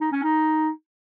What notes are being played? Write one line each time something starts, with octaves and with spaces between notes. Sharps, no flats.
D#4
C#4
D#4